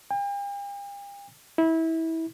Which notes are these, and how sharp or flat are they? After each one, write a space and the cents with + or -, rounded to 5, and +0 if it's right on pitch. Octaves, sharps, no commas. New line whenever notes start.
G5 +45
E4 -25